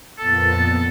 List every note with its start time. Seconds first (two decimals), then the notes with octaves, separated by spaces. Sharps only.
0.19 F2 A#2 B3 A4 A6